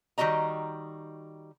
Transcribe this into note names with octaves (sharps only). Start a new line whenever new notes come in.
D#3 G3 F#4 D#5 A#5